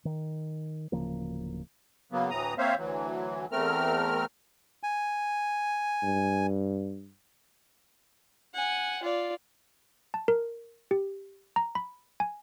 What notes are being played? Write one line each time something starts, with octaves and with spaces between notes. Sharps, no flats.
D#3
D1 C#3 F3 A#3
C#3 F#3 A#3 B3
D2 A2 E3 A#5 D#6
A#3 C4 C5 C#5 E5 F5
D2 E3 F#3
E2 A3 C4 A#4 F6
G#5
G2
F#5 G#5
F4 D5
A5
A#4
G4
A#5
B5
G#5